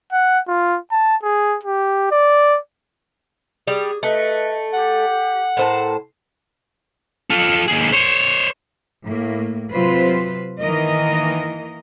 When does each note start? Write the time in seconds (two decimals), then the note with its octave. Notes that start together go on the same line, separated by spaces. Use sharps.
0.12 F#5
0.48 F4
0.92 A5
1.23 G#4
1.63 G4
2.11 D5
3.67 G3 G#4
4.03 A3 B4 D#5
4.74 G4 F#5
5.57 A2 A#4 C5 A5
7.30 F4 A4
7.68 D#2 G#4
7.92 C5 C#5
9.05 A2 A#3
9.72 C3 F#3 F4 B4 C5
10.60 D#3 E3 A#3 A#4 D#5